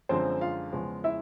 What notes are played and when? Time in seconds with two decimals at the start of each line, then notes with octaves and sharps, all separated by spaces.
0.09 F#2 D3 F3 G#3 C4 C5
0.41 F4 F5
0.72 E2 C#3 F3 G#3
1.04 E4 E5